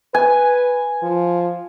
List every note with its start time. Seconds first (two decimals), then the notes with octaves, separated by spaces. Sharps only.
0.14 B4 G#5
1.03 F3